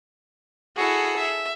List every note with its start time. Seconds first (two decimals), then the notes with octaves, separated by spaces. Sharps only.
0.76 E4 F#4 G#4 A4 F#5
1.16 E5